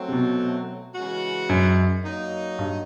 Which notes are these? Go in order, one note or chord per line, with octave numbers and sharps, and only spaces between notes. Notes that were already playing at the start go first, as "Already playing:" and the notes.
Already playing: F#3 A3 C4
C3
B2
C#3 E3 G#3 C#4 F#4
F#2
F#3 A#3 D#4
G2